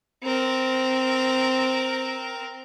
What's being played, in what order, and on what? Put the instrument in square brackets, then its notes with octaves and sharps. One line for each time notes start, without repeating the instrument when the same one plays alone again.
[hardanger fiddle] C4 A#4